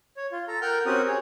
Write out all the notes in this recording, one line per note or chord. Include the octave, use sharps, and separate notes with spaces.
C#5
F4
A4 A#5
A#4 F#5 G5 F6 G6
C4 C#4 F#4 G4 A#4 D#6
G#4 C#5